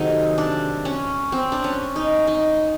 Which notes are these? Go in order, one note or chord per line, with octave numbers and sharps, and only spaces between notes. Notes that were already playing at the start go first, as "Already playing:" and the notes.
Already playing: C3 D#3 F#3 A3 D#4 G#4
D4
C#4
C4
D4
C#4
D#4
D#4